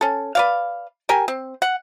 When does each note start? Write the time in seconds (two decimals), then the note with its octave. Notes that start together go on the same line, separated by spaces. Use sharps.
0.01 C#4 A4
0.35 B4 D5 F5
1.09 G4 A#4 G5 G#5
1.28 C4
1.62 F#5